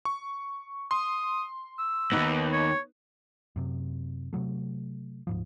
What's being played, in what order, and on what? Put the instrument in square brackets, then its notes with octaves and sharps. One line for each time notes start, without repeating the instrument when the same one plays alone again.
[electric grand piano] C#6
[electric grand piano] C6 [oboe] D#6
[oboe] E6
[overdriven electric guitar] D#2 G#2 [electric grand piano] B3 D#4 B4
[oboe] C#5
[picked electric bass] F#2 C3
C3 D#3 F#3 A3
D1 G#2 F3